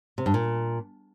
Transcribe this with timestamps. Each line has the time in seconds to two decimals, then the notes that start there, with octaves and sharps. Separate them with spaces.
0.18 C3
0.26 G2
0.34 A#2